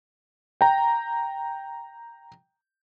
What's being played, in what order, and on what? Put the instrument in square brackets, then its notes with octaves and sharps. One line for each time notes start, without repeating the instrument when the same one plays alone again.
[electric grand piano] G5 A#5